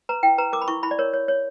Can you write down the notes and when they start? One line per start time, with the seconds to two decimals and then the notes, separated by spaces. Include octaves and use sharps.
0.09 B4 A#5
0.23 E4 G5
0.38 B4 A#5
0.53 A#4 D6
0.61 B5
0.68 E4 C#6
0.83 E4 B5
0.91 D5
0.99 A#4 C#5
1.14 C#5
1.28 C#5